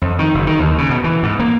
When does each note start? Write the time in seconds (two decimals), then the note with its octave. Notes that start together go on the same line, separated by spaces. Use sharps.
0.02 F2
0.19 D#3
0.34 F#1
0.47 D#3
0.60 D#2
0.78 C#3
0.90 B2
1.04 E3
1.23 G#2
1.39 A#3